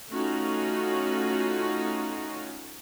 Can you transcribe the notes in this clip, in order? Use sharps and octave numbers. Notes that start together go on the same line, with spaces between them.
A3 C#4 D#4 F4 F#4